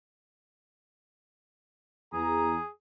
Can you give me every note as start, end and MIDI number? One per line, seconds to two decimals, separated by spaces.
2.13 2.56 40
2.13 2.68 68
2.13 2.56 82